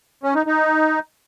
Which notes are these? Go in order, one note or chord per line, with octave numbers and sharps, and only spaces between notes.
C#4
D#4
D#4